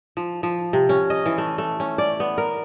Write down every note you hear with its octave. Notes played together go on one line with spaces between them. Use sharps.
F3
F3
C3
C#4
D#5
E3
A3
A3
C#4
D5
B3
A#4